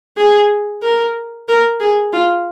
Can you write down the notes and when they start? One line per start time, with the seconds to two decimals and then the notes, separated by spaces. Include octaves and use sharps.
0.17 G#4
0.82 A#4
1.48 A#4
1.80 G#4
2.13 F4